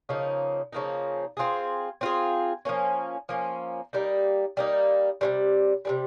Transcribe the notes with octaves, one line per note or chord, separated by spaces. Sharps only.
C#3 F3 A#3 D#4
C#3 F3 A#3 D#4
C4 F4 G#4
C4 F4 G#4
F3 A#3 C#4
F3 A#3 C#4
G3 A#3 D#4
G3 A#3 D#4
C3 D#3 G3
C3 D#3 G3